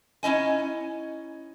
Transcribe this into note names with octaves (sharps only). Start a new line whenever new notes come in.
C#4 D#4 E4 D#5 G#5